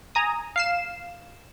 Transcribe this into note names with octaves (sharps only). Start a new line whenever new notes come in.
G#5 A#5 D#6
F5 C7 E7